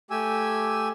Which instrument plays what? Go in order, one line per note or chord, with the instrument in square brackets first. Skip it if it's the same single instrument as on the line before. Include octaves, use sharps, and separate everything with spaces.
[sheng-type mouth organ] A3 G4 G#5 E6